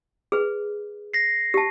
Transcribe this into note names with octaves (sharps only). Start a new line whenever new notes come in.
G#4 B4
A#6 C7
G4 A5